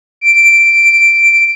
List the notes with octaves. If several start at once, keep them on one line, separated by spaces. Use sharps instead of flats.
D7